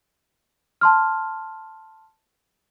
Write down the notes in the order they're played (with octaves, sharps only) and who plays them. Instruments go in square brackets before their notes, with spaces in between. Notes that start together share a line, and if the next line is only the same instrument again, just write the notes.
[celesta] A5 C6 F6